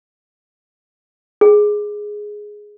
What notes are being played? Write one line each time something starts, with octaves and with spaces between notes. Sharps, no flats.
G#4